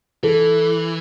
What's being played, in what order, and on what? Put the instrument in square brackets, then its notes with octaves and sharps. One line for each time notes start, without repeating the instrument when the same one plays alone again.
[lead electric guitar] E3 [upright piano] A4